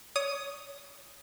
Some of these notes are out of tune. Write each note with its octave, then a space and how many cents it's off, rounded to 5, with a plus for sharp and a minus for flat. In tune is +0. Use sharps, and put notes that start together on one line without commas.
C#5 +20 D#6 +0